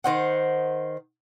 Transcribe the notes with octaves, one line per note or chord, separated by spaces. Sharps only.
D#3 C5 F#5